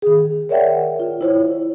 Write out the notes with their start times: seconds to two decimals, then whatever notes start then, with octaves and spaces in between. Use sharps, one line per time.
0.02 D#3 G#4
0.49 A#4 C#5 D5 E5 F#5 G5
1.00 F4
1.21 E4 C5 C#5